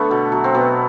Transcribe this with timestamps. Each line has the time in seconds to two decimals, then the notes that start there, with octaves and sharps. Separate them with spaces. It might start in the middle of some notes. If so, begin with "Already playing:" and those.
Already playing: D3 A3 B3
0.11 B2
0.32 F#3
0.44 C4
0.55 B2 B3